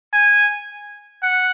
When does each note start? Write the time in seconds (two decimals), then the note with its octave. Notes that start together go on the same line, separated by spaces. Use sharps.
0.13 G#5
1.23 F#5